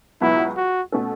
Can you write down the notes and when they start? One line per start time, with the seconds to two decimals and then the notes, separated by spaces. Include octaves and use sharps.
0.21 C#2 B2 F#3 B3 E4
0.57 F#4
0.92 B2 A3 C#4 A4